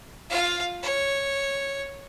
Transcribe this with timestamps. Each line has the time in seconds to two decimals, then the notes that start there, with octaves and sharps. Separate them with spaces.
0.29 F4 F5
0.83 C#5